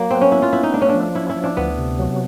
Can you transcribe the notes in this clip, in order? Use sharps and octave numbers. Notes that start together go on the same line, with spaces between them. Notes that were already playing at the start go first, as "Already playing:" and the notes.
Already playing: F#3 A#3
B3 C4
C#4
B3 E4
F4
B3 E4
D#4
A3 D4
C#4
D4
F3
C#4 E4
E4
F3
D4
D2 B3
C3
F#3